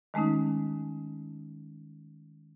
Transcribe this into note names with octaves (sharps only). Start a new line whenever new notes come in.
D#3 G#3 A3 C#4 D#4